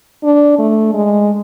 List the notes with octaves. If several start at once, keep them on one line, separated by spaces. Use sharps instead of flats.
D4
A3
G#3